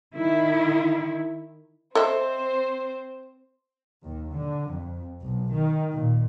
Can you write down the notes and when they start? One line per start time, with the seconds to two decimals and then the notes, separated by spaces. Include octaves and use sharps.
0.16 D#3 E4
1.95 C4 A4 C5 D#5 E5
4.03 D#2
4.32 D3
4.70 F2
5.21 B1
5.53 D#3
5.90 A#2